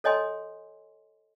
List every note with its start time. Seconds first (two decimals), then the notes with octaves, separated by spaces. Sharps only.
0.04 A4 C#5 D#5 G#5 C6